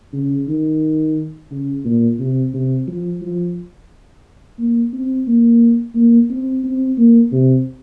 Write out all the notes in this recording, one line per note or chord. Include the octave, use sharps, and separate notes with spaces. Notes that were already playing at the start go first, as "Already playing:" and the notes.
C#3
D#3
C#3
A#2
C3
C3
F3
F3
A#3
C4
A#3
A#3
C4
C4
A#3
C3